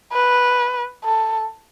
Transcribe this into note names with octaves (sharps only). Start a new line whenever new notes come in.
B4
A4